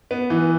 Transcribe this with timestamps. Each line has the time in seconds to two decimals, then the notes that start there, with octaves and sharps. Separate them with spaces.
0.11 B3
0.30 E3